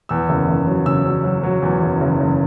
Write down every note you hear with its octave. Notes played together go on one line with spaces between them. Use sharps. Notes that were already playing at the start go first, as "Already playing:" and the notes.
E2 E6
F#1
F#1
F#3
C#3 E6
F#3
F#3
F#3
E2
F#1
F#1
F#1